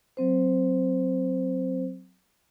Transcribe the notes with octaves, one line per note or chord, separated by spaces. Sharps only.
F#3 C4 C5